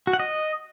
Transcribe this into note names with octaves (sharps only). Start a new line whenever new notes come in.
F#4
F#5
D#5